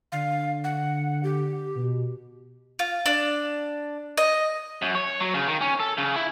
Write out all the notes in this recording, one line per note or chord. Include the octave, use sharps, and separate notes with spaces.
D3 F5
F#5
G4
B2
F4
D4
D#5
F#2
C#5
F#3
C#3
D#3
C#4
A4
C#3
E4